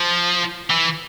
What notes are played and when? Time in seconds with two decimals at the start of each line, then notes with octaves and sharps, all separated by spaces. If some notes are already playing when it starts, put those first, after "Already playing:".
Already playing: F3
0.70 E3